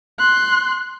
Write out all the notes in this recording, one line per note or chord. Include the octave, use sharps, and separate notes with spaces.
C6 F#6